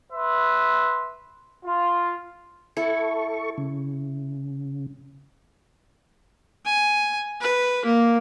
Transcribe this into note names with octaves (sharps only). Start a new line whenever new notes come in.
B4 E5 C6
F4
E4 A4 C#6
C#3
G#5
B4
A#3